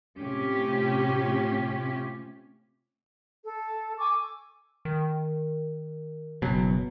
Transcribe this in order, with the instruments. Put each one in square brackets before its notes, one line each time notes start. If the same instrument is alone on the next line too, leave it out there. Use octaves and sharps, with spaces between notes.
[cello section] A2 C3 C#4 F4 G4
[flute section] A4
G#5 C#6 D6 E6
[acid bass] D#3
[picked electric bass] F#1 B2 [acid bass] F#3